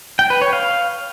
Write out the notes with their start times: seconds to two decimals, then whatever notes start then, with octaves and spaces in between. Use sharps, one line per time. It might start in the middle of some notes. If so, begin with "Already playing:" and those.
0.19 G5
0.30 B4
0.42 C#5
0.53 F5